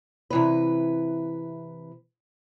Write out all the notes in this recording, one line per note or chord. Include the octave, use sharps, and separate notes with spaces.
C3 E3 B4